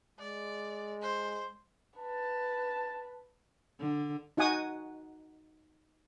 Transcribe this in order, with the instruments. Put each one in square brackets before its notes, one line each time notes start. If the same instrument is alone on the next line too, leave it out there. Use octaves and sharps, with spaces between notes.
[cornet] G#3 [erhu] D5
[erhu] C5
[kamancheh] B4 [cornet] A5
[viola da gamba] D3
[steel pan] D#4 F#4 F#5 G#5 D#6